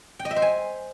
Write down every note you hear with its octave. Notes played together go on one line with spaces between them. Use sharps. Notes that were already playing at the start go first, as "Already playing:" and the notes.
G5
D#5
E5
C5
G#5